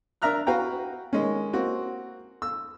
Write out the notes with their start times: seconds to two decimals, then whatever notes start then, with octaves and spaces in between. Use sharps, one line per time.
0.22 D4 A#4 E5 A#5 F6 F#6
0.47 F#4 B4 F5 G5 A#5
1.13 D#3 G#3 C#4
1.53 A#3 C4 F#4
2.42 E6